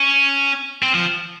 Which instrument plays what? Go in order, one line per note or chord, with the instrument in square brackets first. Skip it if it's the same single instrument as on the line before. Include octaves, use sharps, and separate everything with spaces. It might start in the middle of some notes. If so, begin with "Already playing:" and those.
Already playing: [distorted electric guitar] C#4
C4
F3